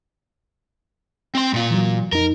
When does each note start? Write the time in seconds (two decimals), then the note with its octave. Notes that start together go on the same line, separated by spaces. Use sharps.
1.35 C4 C6
1.54 A#2 F4
1.71 E3 F#3
2.13 F2 D#4 A#4